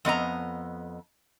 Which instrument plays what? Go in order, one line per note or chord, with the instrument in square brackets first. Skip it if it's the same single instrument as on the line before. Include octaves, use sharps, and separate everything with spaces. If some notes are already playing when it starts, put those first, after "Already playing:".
[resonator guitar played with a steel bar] F2 B3 D#5 A#5